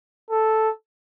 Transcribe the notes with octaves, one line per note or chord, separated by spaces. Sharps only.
A4